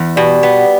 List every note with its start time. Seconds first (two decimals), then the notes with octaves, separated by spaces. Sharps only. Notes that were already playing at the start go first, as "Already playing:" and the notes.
Already playing: E2
0.17 B2 G3
0.43 B3